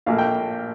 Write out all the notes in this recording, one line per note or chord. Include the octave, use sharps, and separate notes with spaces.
A#1 A#2 A3 F5
G5